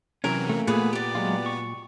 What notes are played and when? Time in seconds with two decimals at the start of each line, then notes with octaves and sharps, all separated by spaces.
0.24 C3 E3 F#3 C#4 A#4
0.49 A3 A#3
0.67 A#2 B3 G#4 B4 D#6
0.93 G4 D5
1.15 F#3 G#3 F4
1.46 C#6